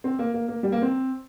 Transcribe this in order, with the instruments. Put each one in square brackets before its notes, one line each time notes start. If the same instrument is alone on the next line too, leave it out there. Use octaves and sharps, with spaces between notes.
[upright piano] C4
A#3
A#3
A#3
G3
A#3
C4